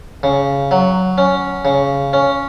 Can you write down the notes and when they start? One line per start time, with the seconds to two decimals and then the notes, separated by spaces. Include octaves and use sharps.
0.23 C#3
0.71 F#3
1.18 C#4
1.65 C#3
2.13 C#4